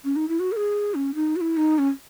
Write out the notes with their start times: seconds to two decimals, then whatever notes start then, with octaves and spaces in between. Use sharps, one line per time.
0.04 C#4
0.16 D#4
0.29 E4
0.40 F#4
0.52 A#4
0.57 G#4
0.95 C#4
1.15 D#4
1.36 F#4
1.41 E4
1.57 D#4
1.79 C#4